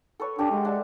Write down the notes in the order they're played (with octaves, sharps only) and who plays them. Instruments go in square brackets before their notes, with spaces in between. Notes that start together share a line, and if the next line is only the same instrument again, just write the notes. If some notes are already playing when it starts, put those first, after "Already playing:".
[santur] A4 B4 C#5
[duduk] D4 [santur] G4 A4 F5
[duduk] G#3 [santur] F#5 D#6
[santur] D4 G4 E5